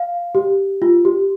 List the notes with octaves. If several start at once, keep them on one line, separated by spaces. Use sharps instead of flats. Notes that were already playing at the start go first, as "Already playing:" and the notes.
Already playing: F5
G4
F4
G4